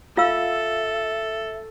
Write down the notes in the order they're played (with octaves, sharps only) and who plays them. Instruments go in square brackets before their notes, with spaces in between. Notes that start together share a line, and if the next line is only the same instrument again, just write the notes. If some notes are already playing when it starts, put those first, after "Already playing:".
[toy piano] F4 F5 E6 [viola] A4 [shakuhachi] E5